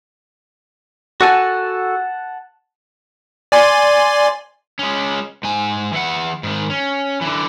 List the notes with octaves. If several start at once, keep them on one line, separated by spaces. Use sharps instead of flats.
F#4 A4 F#5 G#5 A5
D5 G#5 C6
G#3 C#4
G#2 G#5
E3 F#5
G#2 D#3
C#4
D3 E3